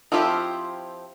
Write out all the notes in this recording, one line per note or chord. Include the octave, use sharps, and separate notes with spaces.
F3 C4 E4 F4 G4